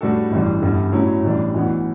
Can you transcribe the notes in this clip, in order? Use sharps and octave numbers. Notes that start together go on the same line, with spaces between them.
A2 G3 D4 F#4 A4
A1 G2 E3 G3
G1 G2 D3 G3
A2 F#3 C#4 E4
A1 A2 E3 G3 D4
B1 A2 E3 B3